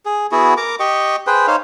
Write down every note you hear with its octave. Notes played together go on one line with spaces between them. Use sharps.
G#4
B3 E4 F#4 G#4
A#4 A#5 D6
G4 D#5 C#6
G#4 B4 C5 G5
D#4 C5 C#5 F5